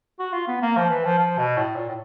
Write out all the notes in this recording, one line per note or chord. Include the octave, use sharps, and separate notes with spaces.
F#4
F4
B3
A#3
F3
E3
F3
F3
B2
A2
A#2
A2